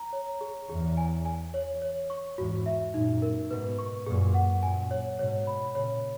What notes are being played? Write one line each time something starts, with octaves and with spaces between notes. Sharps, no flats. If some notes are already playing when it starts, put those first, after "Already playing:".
Already playing: A#5
C#5
G#4
E2 G#4
G#5
G#5
C#5
C#5
C#6
E2 G#2 F#4
E5
F#2 A#2 D#4
A#4
G#2 B2 B4
C#6
F#2 A#2 G#4
F#5
F#2 A#2 G#5
C#5
G#2 B2 C#5
B5
A#2 C#3 C#5